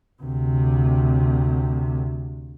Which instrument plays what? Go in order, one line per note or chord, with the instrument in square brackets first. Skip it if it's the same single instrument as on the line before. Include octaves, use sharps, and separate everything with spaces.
[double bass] D2 C3